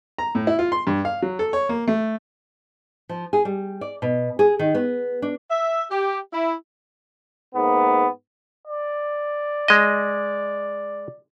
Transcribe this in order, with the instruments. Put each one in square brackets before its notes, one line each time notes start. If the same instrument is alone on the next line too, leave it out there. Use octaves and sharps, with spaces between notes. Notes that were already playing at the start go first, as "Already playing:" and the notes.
[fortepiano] A#5
A2
E4
F4
C6
G2
F5
F#3
A4
C#5
A#3
A3
[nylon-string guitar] F3
G#4
G3
D5
B2
G#4
D#3
B3
D4
[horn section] E5
G4
E4
[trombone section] G#2 A#3 B3
[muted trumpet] D5
[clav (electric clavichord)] G#3 D#5